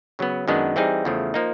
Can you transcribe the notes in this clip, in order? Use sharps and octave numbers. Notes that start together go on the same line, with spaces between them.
C#3 F#3 B3
F#2 D#3 G#3 B3 D4
E3 G3 C4 D#4 G#4
E2 C#3 F3 A3
F3 A#3 D#4